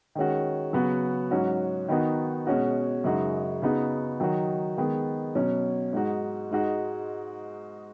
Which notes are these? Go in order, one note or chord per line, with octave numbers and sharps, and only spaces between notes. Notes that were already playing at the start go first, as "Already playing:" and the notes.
D#3 G#3 C#4 F#4
C#3 F#3 B3 F#4
G#2 F#3 C#4 F#4
D#3 B3 D#4 F#4
B2 G#3 C#4 F#4
F#2 C#3 G#3 D#4 F#4
C#3 B3 D#4 F#4
D#3 F#3 D#4 F#4
D#3 G#3 B3
B2 F#3 C#4
G#2 G#3 D#4 F#4
G#2 G#3 D#4 F#4